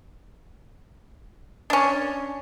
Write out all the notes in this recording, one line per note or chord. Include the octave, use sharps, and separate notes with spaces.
C#4 D4